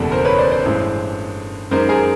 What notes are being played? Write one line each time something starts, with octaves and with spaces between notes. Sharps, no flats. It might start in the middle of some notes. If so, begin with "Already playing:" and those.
Already playing: F#1 E2 B2 G3 A4
A#4 C5
B4 C#5
C5 D5
C5 D5
A1 G2 E3 G#3
F#2 D#3 G#3 A#4 C5
G#4 A#4